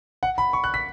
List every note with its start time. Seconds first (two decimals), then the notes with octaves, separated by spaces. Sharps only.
0.23 F#5
0.38 B5
0.53 C#6
0.64 F#6
0.74 B6